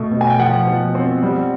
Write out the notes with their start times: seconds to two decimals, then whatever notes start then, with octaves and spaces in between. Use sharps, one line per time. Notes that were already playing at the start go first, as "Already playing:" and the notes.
Already playing: B2 A3
0.12 B2
0.21 G#5
0.30 G5
0.39 F3 F#5
0.67 F3
0.95 C4
1.23 G3